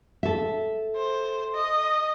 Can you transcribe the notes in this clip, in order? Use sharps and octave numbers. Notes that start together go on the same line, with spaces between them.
A4 E5
C5
D#5